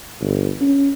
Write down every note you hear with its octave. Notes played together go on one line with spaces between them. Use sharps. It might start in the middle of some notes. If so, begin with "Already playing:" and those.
G1
C#4